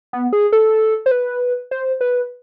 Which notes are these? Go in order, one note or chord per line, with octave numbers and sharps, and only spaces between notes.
B3
G#4
A4
C5
B4
C5
B4